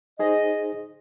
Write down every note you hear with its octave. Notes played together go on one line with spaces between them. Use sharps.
D#4 G#4 C5 D#5